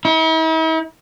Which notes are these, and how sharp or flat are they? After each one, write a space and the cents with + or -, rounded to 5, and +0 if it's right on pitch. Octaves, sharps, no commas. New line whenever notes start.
E4 -45